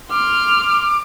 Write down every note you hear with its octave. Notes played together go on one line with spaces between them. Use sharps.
C6 D6 F6